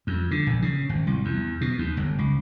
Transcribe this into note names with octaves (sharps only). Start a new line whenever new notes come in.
F2
D3
A#1
C#3
G#1
C2
E2
B2
D#2
G1
C#2